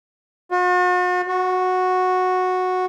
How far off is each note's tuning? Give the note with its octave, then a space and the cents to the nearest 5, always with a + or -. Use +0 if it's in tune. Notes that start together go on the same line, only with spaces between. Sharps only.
F#4 -45
F#4 -10